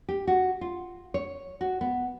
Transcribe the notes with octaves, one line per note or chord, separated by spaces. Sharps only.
G4
F#4
F4
C#5
F#4
B3